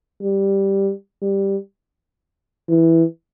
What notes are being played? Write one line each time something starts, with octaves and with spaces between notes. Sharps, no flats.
G3
G3
E3